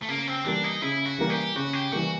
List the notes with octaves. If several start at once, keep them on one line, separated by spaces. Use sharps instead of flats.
A3
C#3 A#3
C4
E3 G3 A#3 D4
D#4
C#3 E4
F#4
E3 G3 A#3
G4
C#3 F#4
G4
E3 G3 A#3 F#4